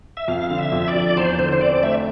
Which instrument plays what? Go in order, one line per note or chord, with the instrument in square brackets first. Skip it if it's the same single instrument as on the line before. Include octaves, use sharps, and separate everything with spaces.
[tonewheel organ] E5
[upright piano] F2 [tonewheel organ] F5
[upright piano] D3
[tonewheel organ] E5
[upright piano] F2
[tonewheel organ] D5
[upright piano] F3
[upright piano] E2 [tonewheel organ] C5
[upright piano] D3 [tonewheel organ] C5
[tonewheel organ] C5
[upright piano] C4 [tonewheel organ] D5
[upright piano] A3 [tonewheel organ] E5